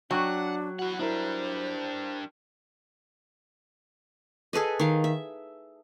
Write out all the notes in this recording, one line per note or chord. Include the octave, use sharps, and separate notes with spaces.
F#3 D4 F#5 G5 C#6 F#6
E4 F#4 F#5
G3 D4 E4 A#4 C5
G#4 A4 B4 D#5
D#3 F5
E5